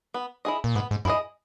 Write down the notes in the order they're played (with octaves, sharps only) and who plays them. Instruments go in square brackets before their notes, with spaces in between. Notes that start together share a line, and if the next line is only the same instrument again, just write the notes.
[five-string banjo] B3
E4 G#4 D#5
[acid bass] A#2
[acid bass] G#2 [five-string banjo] B3
[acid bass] G#2
[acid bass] F#2 [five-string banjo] E4 G#4 D#5